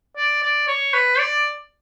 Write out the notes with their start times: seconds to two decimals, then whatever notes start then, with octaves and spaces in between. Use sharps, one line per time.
0.17 D5
0.43 D5
0.68 C#5
0.94 B4
1.19 D5